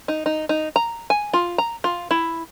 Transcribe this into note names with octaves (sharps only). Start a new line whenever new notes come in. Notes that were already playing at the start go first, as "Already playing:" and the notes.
D#4
D#4
D#4
A#5
G#5
F4
A#5
F4
E4